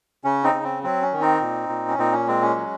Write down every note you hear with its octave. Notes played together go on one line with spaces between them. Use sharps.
C#3 C#4
C4 D#4
C#3
C4
F#3 C4
C#4
D#3
C4 D#4
A#2
A#2
C#4
A#2 C4 D#4
C#4
G#3 C4
C#4
F#3